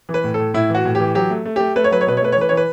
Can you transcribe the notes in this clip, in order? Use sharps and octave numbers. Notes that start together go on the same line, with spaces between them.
E3
B4
A2
A4
A2
A2 E4
E3
F#4
A2
E3 G4
F#3 G4
A3
A3
A3 G4
A3 B4
C#5
F#3 B4
C#5
B2 B4
C#5
A3 B4
C#5
E3
B4
E3 C#5
B4